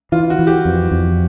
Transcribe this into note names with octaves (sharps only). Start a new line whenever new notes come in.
E3 F4
F#4
E3
G4
F2
F2